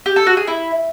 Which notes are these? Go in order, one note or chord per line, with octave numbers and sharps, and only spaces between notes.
G4
A4
F#4
G#4
E4